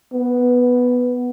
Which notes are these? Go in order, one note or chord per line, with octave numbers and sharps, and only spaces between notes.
B3